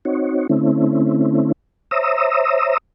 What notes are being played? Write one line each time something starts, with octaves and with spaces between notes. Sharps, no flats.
C4 D#4 F#4 C#5
D3 A3 C4 C#4 E4
C5 C#5 E5 A#5 D#6 E6